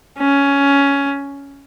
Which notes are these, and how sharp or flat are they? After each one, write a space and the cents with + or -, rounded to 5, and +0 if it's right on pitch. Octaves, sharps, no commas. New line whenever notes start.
C#4 +10